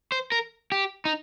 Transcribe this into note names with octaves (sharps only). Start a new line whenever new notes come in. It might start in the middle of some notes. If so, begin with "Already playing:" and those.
C5
A#4
G4
D#4